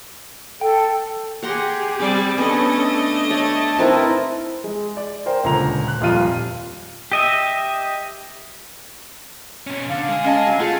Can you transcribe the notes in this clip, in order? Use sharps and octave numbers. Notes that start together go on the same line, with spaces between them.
A4 G5
G4 G#4 F#5 A#5 C6
G3 C4 D5
A3 B3 C#4 D4 A4 D#5
C#5 E5 A5 B5
C4 D#4 E4 A#4 B4
G#3
D5
A#4 C5 D5 G5
D#1 C#2 D3 A#5 F7
F#6
D#1 F2 G3 F4 D#7
G4 D#5 E5
B2 C#4
D3 F5
G#3 G#4
C#4 D#5 A5
F#3
A3 F4 G#4